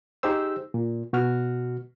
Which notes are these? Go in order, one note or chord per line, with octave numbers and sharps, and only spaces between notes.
D#4 G4 G#4 C5 E6
A#2
B2 F#4 F6